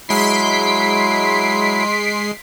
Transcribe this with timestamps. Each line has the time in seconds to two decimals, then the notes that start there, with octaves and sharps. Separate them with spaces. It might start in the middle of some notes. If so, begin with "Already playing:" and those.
0.09 F#3 G#3 E4 C6 B6 C7 D7